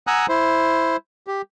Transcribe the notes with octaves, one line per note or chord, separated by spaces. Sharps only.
F#5 G#5 A#5 D#6 E6 F#6
E4 C5
G4